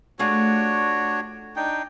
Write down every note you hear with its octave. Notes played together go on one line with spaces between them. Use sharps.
A3 D4 F4 F#4 G#4 C#5
D4 D#4 G5